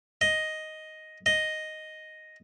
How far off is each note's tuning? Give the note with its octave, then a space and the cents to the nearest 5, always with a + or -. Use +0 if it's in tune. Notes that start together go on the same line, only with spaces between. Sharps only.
D#5 +5
D#5 +0